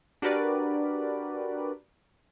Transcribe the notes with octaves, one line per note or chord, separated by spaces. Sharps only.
D4 F#4 G4 A#4 B4 D5